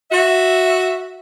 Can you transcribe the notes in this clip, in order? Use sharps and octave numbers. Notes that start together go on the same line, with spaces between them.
F#4 E5